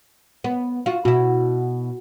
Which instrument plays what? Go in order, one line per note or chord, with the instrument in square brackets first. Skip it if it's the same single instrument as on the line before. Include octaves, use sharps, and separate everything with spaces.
[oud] B3
F4 F#4
[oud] B2 E4 [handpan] F#4